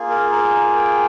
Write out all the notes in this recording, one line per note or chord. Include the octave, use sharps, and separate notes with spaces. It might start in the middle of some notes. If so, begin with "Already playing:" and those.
Already playing: A#3 F4 G#4
A#4
A#4
G5